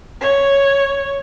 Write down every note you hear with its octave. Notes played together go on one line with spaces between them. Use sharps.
C#5